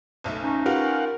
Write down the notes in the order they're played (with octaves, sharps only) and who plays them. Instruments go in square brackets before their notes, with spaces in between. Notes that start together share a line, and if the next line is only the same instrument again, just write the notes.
[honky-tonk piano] F#1 B1 A3
[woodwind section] C#4 D#4
[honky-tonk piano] F4 G4 B4 [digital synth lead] A#4 [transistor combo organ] F5 F#5